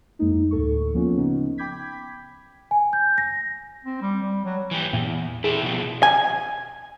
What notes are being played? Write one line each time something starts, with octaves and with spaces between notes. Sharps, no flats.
F2 G#3 A#3 D#4
D2 A2 A4 C#6
F3 A#3 B3 C#4 F4
C#3 B3 C#4 D#4
G5 B5 D6 G6 G#6 B6
G#5
G6
A#6
C4
G3
G3
F#3
E3 G4
E2 A#2
E4 G4 G#4
B2 F3
G#5